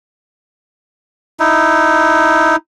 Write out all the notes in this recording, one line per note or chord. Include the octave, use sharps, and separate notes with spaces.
D#4 E4